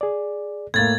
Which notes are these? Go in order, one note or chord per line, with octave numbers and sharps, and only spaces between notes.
G#4 D5
A2 A#3 G#6 A6